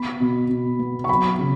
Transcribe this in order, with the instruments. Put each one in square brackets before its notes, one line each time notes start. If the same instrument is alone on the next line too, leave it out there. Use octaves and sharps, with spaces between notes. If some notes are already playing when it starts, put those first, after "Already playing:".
Already playing: [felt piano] B3 B5
B2
B2
B3
C#6
F#3 B5
C#3